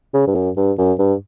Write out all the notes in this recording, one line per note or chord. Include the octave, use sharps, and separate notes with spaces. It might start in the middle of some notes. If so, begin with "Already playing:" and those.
C#3
G2
F#2
G2
F#2
G2